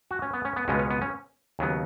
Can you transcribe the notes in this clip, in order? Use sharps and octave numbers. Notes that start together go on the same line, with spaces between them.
F#4
C#4
B3
C#4
B3
C#2 B2 G#3 B3 C#4
C#4
B3
C#4
D#2 C#3 F#3 B3